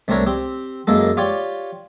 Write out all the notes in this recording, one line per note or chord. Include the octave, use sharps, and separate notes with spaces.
C2 A3 C4 D4 A#4 C#5
C4 G4
F#2 G#3 A#3 A4
F4 G4 C#5 D5